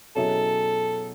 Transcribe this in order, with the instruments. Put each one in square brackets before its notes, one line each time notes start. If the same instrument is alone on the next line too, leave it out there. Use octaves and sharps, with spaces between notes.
[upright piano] B2 F#3 C#4 E4 G#4 [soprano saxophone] A4